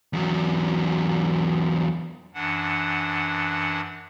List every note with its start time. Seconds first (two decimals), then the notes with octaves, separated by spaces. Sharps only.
0.13 E2 F#3
2.34 F#2 E3 D4 F#5